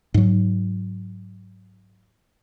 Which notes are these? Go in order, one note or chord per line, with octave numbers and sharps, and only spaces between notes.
G#2 F#3